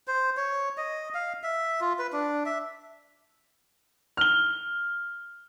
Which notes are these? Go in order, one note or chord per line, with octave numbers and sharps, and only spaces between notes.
C5
C#5
D#5
F5
E5
F4
B4
D4
E5
F6 G7